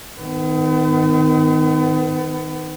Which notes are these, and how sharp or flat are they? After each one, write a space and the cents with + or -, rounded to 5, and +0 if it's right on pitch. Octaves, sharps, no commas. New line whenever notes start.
D#3 +0 B3 +40